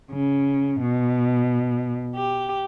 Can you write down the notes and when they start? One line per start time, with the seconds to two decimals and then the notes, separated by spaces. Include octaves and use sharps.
0.12 C#3
0.81 B2
2.15 G4